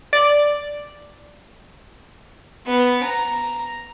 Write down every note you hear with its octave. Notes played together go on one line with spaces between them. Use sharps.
D5
B3
A#5